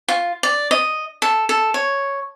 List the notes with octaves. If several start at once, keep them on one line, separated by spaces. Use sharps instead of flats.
F4
D5
D#5
A4
A4
C#5